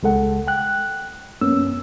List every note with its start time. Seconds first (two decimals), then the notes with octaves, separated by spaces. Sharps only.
0.03 C#2 G#3 A4 F#5
0.48 G5 F#6
1.41 F#2 A#3 B3 C#4 E6